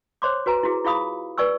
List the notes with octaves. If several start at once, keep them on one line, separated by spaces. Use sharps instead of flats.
C5 C#5 C6 D6
F#4 B4 G#5 A#5
E4 F#4 G#4
E4 F4 G#4 F5 B5 D#6
B4 D5 G#5 C#6 E6